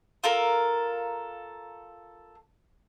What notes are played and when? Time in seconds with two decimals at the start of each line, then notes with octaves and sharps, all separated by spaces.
0.24 F4 A4 A#4